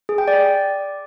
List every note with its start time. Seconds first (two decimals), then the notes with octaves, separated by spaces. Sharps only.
0.09 G#4
0.18 G5
0.28 D5